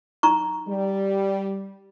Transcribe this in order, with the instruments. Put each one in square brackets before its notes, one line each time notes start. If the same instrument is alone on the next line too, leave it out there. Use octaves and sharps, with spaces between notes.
[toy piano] D#4 A#5 C#6
[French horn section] G3